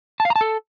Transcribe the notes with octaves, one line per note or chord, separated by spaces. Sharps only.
A5
F5
A#5
A5
A4